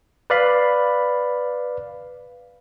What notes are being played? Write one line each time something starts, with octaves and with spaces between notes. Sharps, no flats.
B4 D5 F5 B5